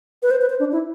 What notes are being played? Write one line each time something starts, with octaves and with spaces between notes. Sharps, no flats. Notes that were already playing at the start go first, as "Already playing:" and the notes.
B4
C5
B4
C5
D4
E4